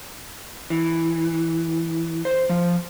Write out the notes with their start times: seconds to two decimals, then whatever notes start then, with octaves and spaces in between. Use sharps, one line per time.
0.70 E3
2.25 C5
2.49 F3